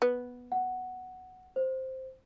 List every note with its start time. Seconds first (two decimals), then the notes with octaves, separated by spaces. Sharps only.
0.02 B3
0.52 F#5
1.56 C5